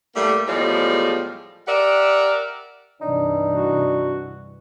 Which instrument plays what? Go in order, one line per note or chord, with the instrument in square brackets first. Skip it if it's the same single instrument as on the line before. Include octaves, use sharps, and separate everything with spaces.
[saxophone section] A2 G3 A3 A#3
E2 A2 F3 G3 G#3
G4 A#4 D5 E5 F#5
[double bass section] C2 G2 E3 [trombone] D4 [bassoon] D#4
[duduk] F#4